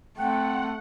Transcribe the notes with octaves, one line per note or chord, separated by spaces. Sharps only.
A3 C4 F#5 G5